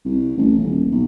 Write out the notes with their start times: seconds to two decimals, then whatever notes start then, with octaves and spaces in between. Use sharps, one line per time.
0.05 C2
0.37 A1
0.59 D#1
0.92 B1